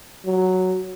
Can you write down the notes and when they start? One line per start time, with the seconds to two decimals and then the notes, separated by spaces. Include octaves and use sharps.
0.25 F#3